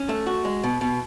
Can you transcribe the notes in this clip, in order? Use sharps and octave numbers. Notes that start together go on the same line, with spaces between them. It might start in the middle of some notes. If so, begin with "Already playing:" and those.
Already playing: C#4
A3
F#4
G#3
B2
B2